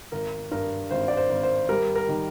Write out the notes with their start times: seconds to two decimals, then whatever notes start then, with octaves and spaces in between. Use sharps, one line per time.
0.12 G#1 A#4
0.51 G2 A#4
0.91 G#1 C5
1.08 D5
1.17 C5
1.30 G#1
1.43 C5
1.69 G3 A#4
1.96 A#4
2.08 D#3